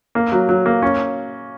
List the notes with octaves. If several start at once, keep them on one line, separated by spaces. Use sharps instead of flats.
A#3
F#3
F#3
A#3
C#4